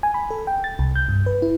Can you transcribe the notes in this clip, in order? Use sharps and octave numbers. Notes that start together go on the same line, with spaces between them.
G#5
B5
A4
G5
A6
C2
G6
G2
B4
E4